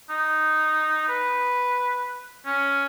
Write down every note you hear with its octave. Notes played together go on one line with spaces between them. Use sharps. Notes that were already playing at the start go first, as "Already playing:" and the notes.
D#4
B4
C#4